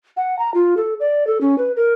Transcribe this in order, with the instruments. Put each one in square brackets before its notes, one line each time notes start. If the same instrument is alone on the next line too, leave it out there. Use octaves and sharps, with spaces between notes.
[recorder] F#5
A#5
F4
A4
D5
A4
C#4
B4
A#4